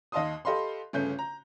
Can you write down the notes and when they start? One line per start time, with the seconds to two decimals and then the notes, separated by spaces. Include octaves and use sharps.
0.12 D#2 D#5 F5 A5 C6 D#6
0.45 G4 A4 D#5 F5 B5 C6
0.93 G1 C#3 A3 C#4 G6
1.19 A#5